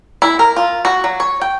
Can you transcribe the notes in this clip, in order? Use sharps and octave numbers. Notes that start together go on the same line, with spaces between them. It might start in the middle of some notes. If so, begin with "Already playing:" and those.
E4
A#4
F4
F#4
F#3
C#5
G5